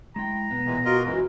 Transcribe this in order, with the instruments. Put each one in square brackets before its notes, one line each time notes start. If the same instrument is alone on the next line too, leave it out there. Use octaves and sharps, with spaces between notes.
[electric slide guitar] G#3 E4 G5 [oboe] A#5
[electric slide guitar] B2 B3
[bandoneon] A#2 E3 G#3
[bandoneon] F4 A#4 D#5 [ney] F#4
[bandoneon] F#2 E3 G#3